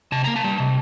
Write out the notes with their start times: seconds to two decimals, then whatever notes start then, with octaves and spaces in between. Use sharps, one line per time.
0.12 C3 A5
0.24 A#3 A#5
0.36 A5
0.44 G3
0.60 C3